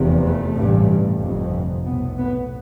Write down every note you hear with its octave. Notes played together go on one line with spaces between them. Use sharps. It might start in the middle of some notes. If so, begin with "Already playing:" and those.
Already playing: F1 E2 C3
A3
A1 G2
G1 F2 C3
B1 A2 B3
B3